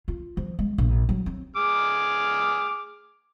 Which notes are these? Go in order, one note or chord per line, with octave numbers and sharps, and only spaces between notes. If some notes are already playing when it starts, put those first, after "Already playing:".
F4
F3
G#3
A#1
F#3
C4
G#4 D6 F6